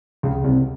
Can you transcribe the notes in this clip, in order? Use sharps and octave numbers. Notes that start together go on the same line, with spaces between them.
C#2 C#3
C2 C3